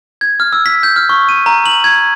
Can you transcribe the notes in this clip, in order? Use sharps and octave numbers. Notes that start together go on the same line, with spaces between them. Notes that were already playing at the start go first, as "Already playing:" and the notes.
G#6
F6
E6
B6
G6
F6
C#6
D#7
A#5
F#7
G#6